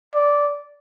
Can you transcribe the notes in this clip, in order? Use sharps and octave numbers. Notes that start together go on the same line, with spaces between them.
D5